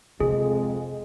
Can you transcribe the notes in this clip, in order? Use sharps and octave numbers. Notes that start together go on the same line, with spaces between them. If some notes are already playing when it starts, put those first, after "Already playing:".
F2 C3 G#3 G#4